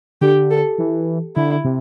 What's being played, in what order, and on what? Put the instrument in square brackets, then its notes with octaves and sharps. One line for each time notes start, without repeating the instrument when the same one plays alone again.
[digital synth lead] D3 [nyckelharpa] G4
[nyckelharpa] A4
[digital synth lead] E3
[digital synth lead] D3 [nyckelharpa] E4
[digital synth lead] C3